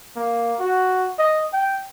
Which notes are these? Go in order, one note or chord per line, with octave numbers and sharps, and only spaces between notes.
A#3
F#4
D#5
G5